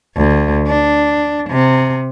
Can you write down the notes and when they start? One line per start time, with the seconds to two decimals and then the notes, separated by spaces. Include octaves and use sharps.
0.17 D2
0.67 D4
1.50 C3